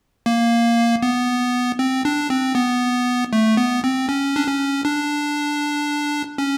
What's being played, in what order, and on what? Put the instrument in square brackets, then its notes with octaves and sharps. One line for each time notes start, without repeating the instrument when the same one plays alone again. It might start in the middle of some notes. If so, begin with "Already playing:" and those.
[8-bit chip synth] A#3
B3
C4
D4
C4
B3
A3
B3
C4
C#4
D4
C#4
D4
C#4